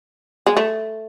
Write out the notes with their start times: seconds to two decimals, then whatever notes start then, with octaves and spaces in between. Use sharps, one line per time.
0.46 G#3
0.57 A3